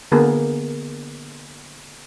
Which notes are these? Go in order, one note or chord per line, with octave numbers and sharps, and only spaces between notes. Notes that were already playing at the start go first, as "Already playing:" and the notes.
D3 A#3 B3 G#4